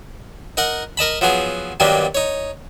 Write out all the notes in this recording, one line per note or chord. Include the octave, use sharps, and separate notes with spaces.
D#4 A#4 F#5
A#4 D#5 A5 B5
F3 F#3 B3 G#4
G2 D#3 F#3 G3 A#3 B3
D#4 C#5